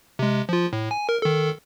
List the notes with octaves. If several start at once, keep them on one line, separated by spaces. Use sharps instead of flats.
C3 G#3
F3 F4
A2
G#5
A#4
D#3 A4